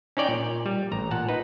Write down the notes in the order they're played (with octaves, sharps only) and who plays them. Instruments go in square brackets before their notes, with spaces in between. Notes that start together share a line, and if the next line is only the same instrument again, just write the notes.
[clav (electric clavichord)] C#4 D#4 C#5 D5 G5
A#2
G3
A1 A#5
A#2 F#5 A5
D#4 B4